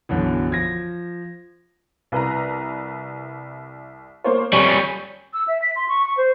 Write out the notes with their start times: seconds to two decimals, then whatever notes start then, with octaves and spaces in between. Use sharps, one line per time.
0.09 B1 F#2 D3 E3
0.51 F3 G#6 A#6
2.12 C2 B4 A#5
4.24 A#3 C5 C#5
4.53 F2 G3 C#4 C#6 D#7
5.33 E6
5.48 E5
5.62 B6
5.76 C6
5.88 C#6
6.05 C#6
6.17 C5